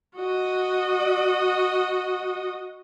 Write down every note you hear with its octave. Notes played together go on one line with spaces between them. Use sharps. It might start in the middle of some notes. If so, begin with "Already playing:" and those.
F#4 D#5